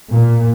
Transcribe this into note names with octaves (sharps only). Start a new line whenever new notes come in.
A#2